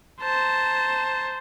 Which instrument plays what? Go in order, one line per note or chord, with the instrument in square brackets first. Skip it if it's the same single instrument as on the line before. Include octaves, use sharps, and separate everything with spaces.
[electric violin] C5 [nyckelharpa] A5 A#5